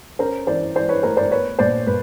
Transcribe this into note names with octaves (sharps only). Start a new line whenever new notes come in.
C#4 A#4 C5
E3 C5 D5
E3 C5 D5
B4 C#5
A3 A#4 C5
C5 D5
B3 B4 C#5
A#2 C5 D5
A#2 B4